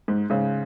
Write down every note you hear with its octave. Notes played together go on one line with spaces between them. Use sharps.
G#2
G#2 C#3